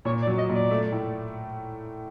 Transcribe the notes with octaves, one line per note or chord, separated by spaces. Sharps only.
A#2 C#5
D5
F#3
D#5
A#2
D5
A3
A2